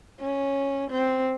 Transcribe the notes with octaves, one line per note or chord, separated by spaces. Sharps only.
C#4
C4